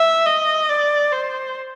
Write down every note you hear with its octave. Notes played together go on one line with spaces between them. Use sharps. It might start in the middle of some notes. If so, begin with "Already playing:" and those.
Already playing: E5
D#5
D5
C5